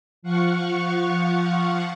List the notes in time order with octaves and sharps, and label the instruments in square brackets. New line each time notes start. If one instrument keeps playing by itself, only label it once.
[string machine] F3 F5 F#5 C#6